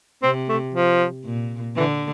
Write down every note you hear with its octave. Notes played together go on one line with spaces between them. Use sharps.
C3 C4
A3
F3
A#2
D3 E3